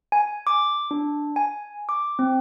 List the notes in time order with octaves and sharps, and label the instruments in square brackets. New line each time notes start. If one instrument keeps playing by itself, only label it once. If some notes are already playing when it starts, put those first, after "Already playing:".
[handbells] G#5
D6
D4
G#5
D6
C4